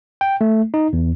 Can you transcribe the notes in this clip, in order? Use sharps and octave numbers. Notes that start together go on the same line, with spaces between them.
G5
A3
D#4
E2